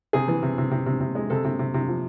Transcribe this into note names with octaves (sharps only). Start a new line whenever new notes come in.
C3 G#4
E3
C3
C3
C3
C3
C3
G#3
C3 A4
C3
C3
C3
F3